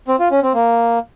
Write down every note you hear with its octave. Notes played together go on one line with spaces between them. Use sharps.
C4
F4
C#4
C4
A#3